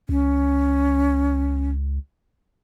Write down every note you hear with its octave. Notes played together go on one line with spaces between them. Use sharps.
C#2 C#4